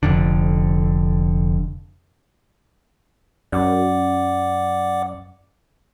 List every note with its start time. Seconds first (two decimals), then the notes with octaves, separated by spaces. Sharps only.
0.03 F1 F2 D3
3.52 F#2 D5 F#5 D6